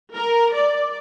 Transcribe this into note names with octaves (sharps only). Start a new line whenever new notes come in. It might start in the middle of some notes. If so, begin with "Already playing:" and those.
A#4
D5